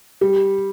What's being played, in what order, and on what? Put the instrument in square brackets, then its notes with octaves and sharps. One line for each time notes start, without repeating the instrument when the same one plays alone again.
[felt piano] G3